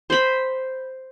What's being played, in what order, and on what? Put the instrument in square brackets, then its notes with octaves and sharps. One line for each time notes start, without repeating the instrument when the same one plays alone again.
[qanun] C5 B5